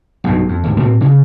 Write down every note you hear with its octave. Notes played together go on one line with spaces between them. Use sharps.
B1 G2 B2
F2
G#1 D2
A2 C4
C#3